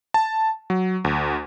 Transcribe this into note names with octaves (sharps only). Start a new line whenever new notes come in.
A5
F#3
D2